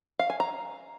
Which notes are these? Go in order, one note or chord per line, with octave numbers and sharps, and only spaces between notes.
F5
G#5
A#5